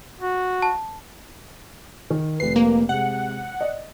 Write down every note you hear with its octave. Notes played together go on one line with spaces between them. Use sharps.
F#4
A5
D#3
F1 B4 C7
A#3
C3 G#3 F#5
D5 D#5